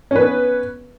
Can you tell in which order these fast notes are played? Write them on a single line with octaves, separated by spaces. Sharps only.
C#4 B4 B3